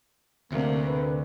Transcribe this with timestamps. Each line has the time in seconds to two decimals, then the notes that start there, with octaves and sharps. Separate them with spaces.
0.52 D2 C3 A#3
0.84 D3 A#4 B4